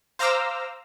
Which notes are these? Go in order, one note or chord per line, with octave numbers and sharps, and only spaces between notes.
C5 F5 A#5 D6 E6 F6